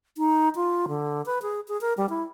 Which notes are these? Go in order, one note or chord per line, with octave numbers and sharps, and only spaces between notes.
D#4
F4
D3
B4
G#4
G#4
A#4
G3
E4